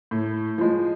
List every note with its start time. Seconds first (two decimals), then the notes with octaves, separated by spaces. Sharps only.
0.11 A2
0.58 F3 G#3